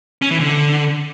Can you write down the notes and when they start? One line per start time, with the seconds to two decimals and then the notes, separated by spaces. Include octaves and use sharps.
0.22 C#4
0.31 E3
0.40 D3